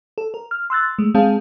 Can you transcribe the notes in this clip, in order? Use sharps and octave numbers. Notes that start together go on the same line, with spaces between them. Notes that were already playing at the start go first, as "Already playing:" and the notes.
A4
A#4
F6
C6 E6 F#6 A6
G#3 A3
G#3 C4 G#4 F5 A5